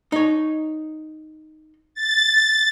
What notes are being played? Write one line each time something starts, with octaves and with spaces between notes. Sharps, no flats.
D#4 C#5
A6